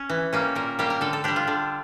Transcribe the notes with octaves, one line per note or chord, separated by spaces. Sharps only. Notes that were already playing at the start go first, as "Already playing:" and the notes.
Already playing: C#4
E3
G3 A#3 C#4
A#2 A#4
G3 A#3 G4
A#4
D3 A4
A4
G3 D4 G4
F4
D3